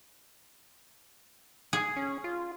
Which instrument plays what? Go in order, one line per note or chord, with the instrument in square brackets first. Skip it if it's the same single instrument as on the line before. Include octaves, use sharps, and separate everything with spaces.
[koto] G#4
[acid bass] C#4
F4